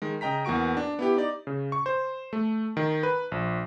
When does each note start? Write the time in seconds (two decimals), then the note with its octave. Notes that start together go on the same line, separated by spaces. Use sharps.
0.02 D#3 G#3
0.21 C#3 D#5 G5 A#5 B6
0.45 E2 A#3 F#4 C#6 D7
0.77 D4
0.99 B3 E4 G4
1.17 D#4 D5
1.47 C#3
1.72 C#6
1.86 C5
2.33 A3
2.77 D#3
3.03 B4
3.32 A#1